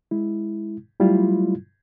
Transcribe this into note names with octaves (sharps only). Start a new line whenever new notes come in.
G#3 E4
F#3 G3 A3 E4 F4